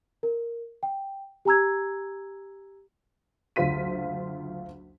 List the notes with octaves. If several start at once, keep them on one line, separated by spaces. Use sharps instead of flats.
A#4
G5
G4 G#5 A#5 E6 G#6
F#1 D2 F4 C5 B6 D#7